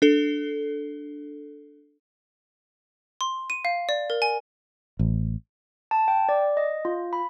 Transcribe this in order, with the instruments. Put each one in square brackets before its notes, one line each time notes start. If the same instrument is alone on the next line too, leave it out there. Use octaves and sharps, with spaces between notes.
[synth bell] D4 A4
[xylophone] C6
D#7
F5
D5
A#4
G#5
[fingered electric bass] A1
[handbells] A5
G5
D5
D#5
F4
B5